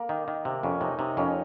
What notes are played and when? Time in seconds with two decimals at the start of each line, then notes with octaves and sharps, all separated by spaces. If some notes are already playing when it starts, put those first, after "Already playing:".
Already playing: A#3
0.09 D#3
0.28 D#3
0.45 C3
0.63 F2 C#4
0.81 C3 D#4
0.99 C3 D#4
1.17 F2 C#4